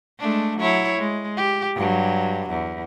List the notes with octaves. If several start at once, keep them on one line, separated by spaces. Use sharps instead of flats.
G#3 A3 D4
F#3 E4 C#5
G#3
G4
G2 F#3
E2